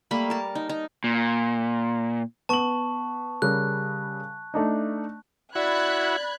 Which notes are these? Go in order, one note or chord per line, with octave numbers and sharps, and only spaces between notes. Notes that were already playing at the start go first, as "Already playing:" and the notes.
G3 A3 A#3 B5
A#4 A5
D#4
D#4
A#2
B3 A5 C#6 F#7
C#3 G3 A#4 F#6
A3 D4 D#4
E4 F#4 D5 B5 F#6 G#6